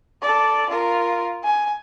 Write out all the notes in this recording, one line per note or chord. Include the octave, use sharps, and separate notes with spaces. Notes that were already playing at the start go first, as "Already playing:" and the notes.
A4 D5
F4 A#4
G#5